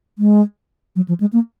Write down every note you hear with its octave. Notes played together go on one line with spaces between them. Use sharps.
G#3
F#3
F3
G#3
A#3